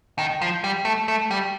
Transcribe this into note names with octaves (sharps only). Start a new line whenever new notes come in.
D#3
F3
G3
A3
A3
G3